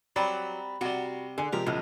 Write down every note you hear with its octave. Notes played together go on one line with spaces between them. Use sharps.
F#3 G3 C4 D5 A#5 B5
C3 G3 F#4
D3 G#4 G#5
C3 F3 G#3 G4 A#4
B1 A2 C#3 F3 G#3